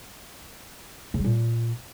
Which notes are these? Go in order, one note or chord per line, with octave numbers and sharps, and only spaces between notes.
C#3
G3
A#2